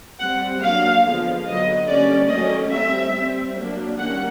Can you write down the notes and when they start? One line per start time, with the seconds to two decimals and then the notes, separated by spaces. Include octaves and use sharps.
0.19 G3 C4 F#5
0.62 F#3 A#3 D4 F5
1.03 D3 F3 G#3 B3
1.45 D3 F#3 B3 D#5
1.87 D3 G3 A#3 C#4 D5
2.29 D#3 F#3 A3 C#4 D#5
2.72 G3 C4 E5
3.13 G3 C4
3.56 F#3 A#3 D4
3.97 D#3 G3 A#3 C#4 F#5